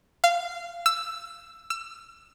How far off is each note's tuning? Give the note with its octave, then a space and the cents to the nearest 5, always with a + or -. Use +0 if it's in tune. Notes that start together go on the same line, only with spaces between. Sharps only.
F5 -20
E6 +10
E6 +30